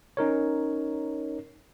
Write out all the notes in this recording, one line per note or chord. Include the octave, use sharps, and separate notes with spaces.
C#4 D#4 A#4 C#5